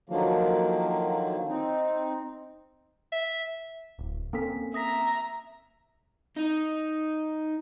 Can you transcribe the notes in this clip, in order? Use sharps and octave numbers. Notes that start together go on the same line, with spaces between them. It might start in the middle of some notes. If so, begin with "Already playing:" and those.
D3 D#3 F3 F#3 A#3
C4 D#4
E5
D1
A#3 C4 C#4 A4 B6
E5 A#5 D#6 A#6 B6
D#4